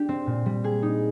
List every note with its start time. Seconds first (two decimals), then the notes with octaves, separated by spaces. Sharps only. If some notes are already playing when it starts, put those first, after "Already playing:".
Already playing: D4 G4
0.09 C4
0.27 A#2
0.46 G3
0.64 G#4
0.82 D#4